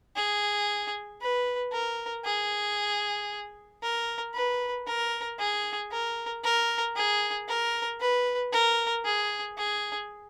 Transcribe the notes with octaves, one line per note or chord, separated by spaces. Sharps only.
G#4
B4
A#4
G#4
A#4
B4
A#4
G#4
A#4
A#4
G#4
A#4
B4
A#4
G#4
G#4